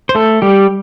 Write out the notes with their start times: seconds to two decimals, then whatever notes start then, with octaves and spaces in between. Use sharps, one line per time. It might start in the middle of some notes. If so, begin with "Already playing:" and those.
0.09 C5
0.15 A3 A4
0.42 G3 G4